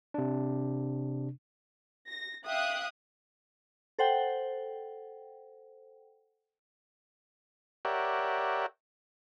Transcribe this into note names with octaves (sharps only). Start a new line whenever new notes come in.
C3 D4
A#6
E5 F5 G5 D#6 F#6
A4 C5 F#5 G5
G4 A#4 C#5 D5 E5 F#5